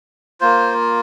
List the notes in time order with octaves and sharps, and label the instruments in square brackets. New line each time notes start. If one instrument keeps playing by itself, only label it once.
[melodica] A#3 F4 C5